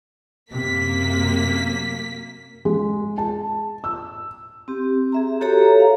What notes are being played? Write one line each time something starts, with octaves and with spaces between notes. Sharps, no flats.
F#2 C3 A#3 B6
G#3
A5
E6
C4 G4
G#4 E5 A#5
F#4 G4 A4 C#5 E5 A#5
F5